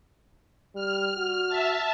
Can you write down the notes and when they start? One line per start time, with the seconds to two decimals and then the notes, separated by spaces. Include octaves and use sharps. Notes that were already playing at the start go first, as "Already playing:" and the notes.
0.75 G3 F6
1.17 F#4
1.49 E5 A5